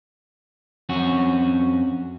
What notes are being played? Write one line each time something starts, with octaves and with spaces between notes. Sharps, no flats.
F2 C#4 F#4